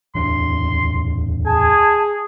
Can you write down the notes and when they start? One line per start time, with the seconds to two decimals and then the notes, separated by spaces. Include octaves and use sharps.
0.15 D1 E2 D4 C6
1.46 G#4 G#5 A5